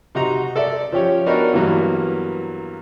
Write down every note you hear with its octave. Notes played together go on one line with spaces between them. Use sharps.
C3 D#4 F#4 A#5
A4 D5 E5
F3 C#4 G4 C#5
B3 D4 D#4 F#4 A#4
G2 E3 F#3 A#3 B3